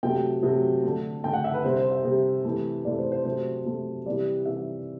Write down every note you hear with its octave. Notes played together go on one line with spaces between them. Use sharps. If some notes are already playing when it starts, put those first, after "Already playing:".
C3 F#3 A3 G5
C3 F#3 A3
D3 A3
D3 A3 G5
F#5
E5
B4
C3 G3 C5
C5
E5
C3 G3
C3 E3 A3
C3 E3 A3 D5
C5
C5
C3 F#3 A3 C5
C3 F#3 A3
C3 E3 G3 D5
C3 E3 G3 E5